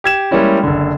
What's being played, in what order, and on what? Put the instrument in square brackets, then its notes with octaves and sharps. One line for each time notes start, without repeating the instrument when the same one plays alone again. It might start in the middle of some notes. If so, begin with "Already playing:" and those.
[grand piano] G4 G#6 E7
G3 G#3 A#3 C#4 E4
F#1 D3